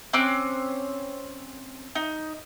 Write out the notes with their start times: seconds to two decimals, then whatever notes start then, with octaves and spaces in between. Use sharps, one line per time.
0.13 C4 C#4 D6 F#6
1.95 D#4